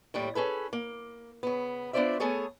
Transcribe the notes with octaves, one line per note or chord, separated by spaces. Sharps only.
D#2 A2 G3
C#4 G#4 A4 B4
A#3
C#3 B3
B3 D4 F4 C5 D5 E5
A3 B3 G#4 A4 C#5